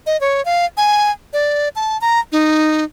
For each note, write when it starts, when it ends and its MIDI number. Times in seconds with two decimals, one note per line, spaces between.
0.06 0.19 75
0.21 0.44 73
0.45 0.66 77
0.77 1.11 80
1.33 1.69 74
1.76 2.00 81
2.01 2.20 82
2.32 2.84 63